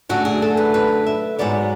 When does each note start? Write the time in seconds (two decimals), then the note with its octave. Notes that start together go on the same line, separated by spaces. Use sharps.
0.09 F#2 D3 A3 F#4
0.25 G#4
0.42 A4
0.57 B4
0.74 B4
1.06 E5
1.39 G#2 F#3 B3 D5